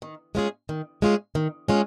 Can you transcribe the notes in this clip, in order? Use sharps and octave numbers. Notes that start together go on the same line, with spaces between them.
D#3
G#3 C#4 F4 G#4
D#3
G#3 C#4 F4 G#4
D#3
G#3 C#4 F4 G#4